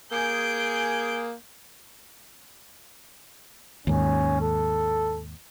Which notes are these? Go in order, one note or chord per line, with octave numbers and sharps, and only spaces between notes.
A#3 G#4 G6 D7
D#2 G#2 C#4
A4